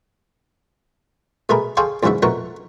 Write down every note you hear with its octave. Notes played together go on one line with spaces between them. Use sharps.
B2 A3 G#4 A#4 B5
G#4 A4 C#5 F5 G5 C6
E2 G#2 C#3 E4 F#4 E5
F2 B2 A3 A#4 F#5 C#6